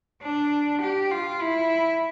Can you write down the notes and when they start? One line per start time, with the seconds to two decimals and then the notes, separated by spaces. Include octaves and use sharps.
0.22 D4
0.82 G4
1.12 F4
1.41 E4